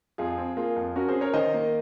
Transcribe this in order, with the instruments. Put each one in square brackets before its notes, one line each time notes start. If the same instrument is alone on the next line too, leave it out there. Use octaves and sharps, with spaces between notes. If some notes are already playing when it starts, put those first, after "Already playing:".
[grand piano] F2 F4 G#4
C4
A#3 F4 G#4
F2
C#4 F#4 A#4
G#4 C5
C#4
A#4 C#5
D#3 C5 D#5
A#3